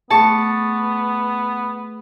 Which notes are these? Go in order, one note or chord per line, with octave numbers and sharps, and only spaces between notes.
A3 B3 G#4 A5 C#6